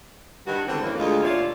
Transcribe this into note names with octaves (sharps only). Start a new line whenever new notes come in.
G2 D#3 F#4
D3 E3 G3 G#3 B3 C4
F#2 A2 E3 A#3
D2 G#3 F4
D#2 B2 F4 C#5 D5 E5